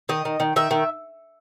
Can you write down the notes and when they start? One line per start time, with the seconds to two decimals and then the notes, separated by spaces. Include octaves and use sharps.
0.09 D#3 D#5
0.25 D#3
0.40 D#3
0.56 D#3 E5
0.71 D#3